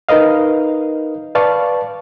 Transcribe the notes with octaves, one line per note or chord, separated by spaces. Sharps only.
D#4 A#4 B4 D#5 F5
B4 D5 F5 A5 C#6